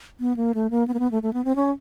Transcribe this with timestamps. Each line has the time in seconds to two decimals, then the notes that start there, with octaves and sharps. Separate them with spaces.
0.20 B3
0.37 A#3
0.54 A3
0.71 A#3
0.88 B3
0.94 A#3
0.99 B3
1.11 A3
1.23 A3
1.33 B3
1.45 C4
1.56 C#4